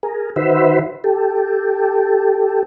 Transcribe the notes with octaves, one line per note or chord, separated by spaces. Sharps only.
G#4 A#4
D#3 F#4 B4 C5 E5
G4 A4